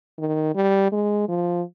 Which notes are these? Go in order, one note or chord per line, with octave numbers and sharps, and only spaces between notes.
D#3
G3
G#3
F3